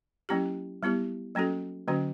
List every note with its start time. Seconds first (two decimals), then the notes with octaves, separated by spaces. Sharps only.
0.29 F#3 A#3 C#4 E4 G4
0.83 G3 B3 E4 G4
1.35 F#3 A#3 C#4 F#4 A4
1.88 D3 F#3 A#3 C#4 F#4